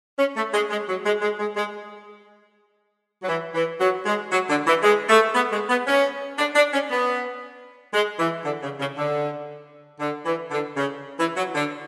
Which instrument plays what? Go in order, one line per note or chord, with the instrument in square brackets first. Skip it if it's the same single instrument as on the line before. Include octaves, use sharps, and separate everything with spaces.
[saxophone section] C#4
A3
G#3
G#3
F#3
G#3
G#3
G#3
G#3
F#3
E3
E3
F#3
G#3
F#3
D3
E3
G#3
A3
B3
G#3
B3
C#4
D4
D4
C#4
B3
G#3
E3
D3
C#3
C#3
D3
D3
E3
D3
C#3
E3
F#3
D3